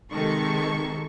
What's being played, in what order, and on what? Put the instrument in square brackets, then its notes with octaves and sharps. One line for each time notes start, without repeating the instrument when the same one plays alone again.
[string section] C3 D#3 G#3 A4 C#6